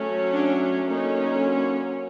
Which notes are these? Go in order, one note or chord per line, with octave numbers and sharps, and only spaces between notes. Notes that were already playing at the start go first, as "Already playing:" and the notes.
Already playing: F#3 A3 C#4
D4
D3 F#3 A#3 C#4 D#4